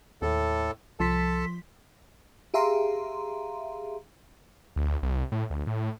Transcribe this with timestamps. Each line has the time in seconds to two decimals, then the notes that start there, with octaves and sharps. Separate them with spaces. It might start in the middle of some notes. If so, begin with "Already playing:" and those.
0.22 D#2 A2 A4
1.00 C2 F3 A4 A5 C6 B6
2.54 G4 G#4 E5 F5 A#5 C6
4.76 D2
5.03 C2
5.32 A2
5.50 D2
5.67 A2